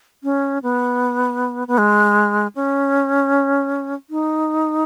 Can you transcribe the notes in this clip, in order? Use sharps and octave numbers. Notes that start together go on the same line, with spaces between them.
C#4
B3
B3
G#3
C#4
D#4